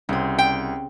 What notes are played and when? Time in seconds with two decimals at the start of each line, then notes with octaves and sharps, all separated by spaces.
0.09 C2 C#3 C4
0.39 G5